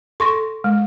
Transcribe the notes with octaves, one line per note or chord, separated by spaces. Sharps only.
A4 C6 C#6 A#6
G#3